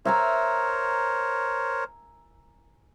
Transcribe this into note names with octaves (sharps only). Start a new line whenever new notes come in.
A#4 C5 C#5 E5 G#5 A#5